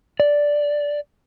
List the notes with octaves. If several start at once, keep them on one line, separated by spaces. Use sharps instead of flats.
D5